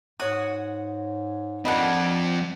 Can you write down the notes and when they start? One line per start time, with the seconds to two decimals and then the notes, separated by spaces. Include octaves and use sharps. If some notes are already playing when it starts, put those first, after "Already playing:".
0.20 G#2 F#4 C#5 D#6
1.65 F3 G3 A#3 C4 D4 D#5 F#5